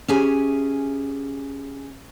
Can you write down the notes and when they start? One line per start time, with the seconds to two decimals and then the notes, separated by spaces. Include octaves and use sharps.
0.08 C#4 G4 G#4 E5 G#5